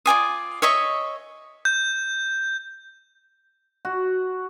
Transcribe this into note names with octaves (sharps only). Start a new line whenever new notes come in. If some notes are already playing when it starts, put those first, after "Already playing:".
F4 D5 G#5 D#6
C#5 D#5 E5 C#6
G6
F#4